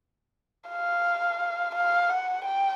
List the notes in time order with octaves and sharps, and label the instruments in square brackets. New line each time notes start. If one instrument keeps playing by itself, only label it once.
[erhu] F5
F5
F#5
G5